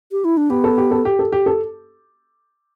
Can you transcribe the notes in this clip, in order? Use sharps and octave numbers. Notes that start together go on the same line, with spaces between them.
G4
E4
D4
B3 G4
A4
G4
A4
G4
A4
G4
A4